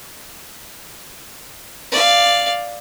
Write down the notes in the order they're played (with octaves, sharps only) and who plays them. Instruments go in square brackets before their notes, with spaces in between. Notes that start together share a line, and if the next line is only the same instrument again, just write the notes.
[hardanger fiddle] D5 F5